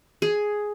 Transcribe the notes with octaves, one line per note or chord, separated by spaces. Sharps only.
G#4